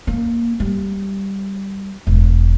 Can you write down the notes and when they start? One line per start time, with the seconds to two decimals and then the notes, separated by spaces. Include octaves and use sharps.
0.07 A#3
0.60 G3
2.07 E1